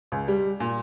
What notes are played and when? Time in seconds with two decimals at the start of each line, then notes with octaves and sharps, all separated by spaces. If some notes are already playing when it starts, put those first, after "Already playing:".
0.12 C#2
0.28 G3
0.60 A#2